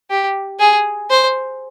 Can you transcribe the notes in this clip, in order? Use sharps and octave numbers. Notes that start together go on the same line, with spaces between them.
G4
G#4
C5